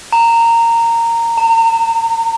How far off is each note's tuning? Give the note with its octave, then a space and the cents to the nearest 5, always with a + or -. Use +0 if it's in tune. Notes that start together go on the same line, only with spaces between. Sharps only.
A#5 -15
A#5 -40